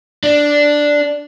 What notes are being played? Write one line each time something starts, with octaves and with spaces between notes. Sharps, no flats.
D4